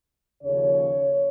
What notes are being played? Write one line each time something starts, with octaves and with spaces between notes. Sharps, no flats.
D#2 C#3 F3 A#3 C#5